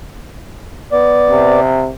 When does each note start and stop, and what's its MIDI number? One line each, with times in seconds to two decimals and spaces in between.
0.92 1.60 59
0.92 1.60 74
1.30 1.91 48